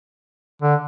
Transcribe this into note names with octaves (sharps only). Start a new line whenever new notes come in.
D3